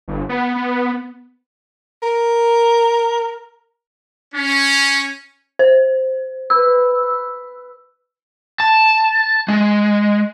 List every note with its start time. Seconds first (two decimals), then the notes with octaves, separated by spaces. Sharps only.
0.08 G1
0.29 B3
0.55 B3
2.03 A#4
4.35 C#4
5.59 C5
6.50 B4 E6
8.60 A5
9.48 G#3